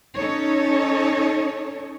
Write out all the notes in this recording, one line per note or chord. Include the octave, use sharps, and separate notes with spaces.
C#4 D#4 A4 C#5